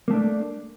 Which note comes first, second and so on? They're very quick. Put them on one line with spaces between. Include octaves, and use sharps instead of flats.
A#3 A3 D4